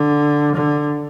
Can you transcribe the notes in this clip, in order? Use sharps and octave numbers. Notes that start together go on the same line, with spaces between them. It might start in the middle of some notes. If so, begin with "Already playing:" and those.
Already playing: D3
D3